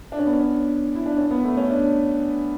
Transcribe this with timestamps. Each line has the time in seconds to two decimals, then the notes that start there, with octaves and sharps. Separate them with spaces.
0.12 D4
0.19 C#4
0.26 B3
0.33 C#4
0.95 E4
1.06 D4
1.17 C#4
1.31 B3
1.44 A3
1.57 C#4
1.70 D4